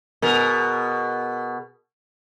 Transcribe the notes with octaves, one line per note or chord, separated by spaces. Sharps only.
B2 G#4 A#4